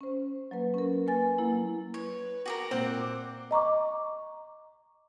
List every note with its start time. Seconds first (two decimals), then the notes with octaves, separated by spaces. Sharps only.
0.01 C#4 C5
0.51 F#3 A#3 B4
0.74 C#4 A#4
1.07 A#3 B4 G#5 A6
1.38 F#3 A#3 E4
1.94 B4 C#5
2.46 F#4 G#4 A#4 D6
2.71 A#2 C4 A#4 F#5
3.51 D#5 A#5 C#6 D6